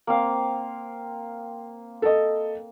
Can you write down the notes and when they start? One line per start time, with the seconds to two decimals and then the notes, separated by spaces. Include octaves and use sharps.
0.07 A#3 C4 F5
2.02 A4 D#5